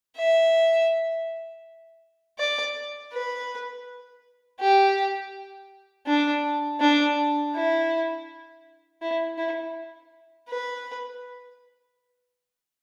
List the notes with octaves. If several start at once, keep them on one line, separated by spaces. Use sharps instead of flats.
E5
D5
B4
G4
D4
D4
E4
E4
E4
B4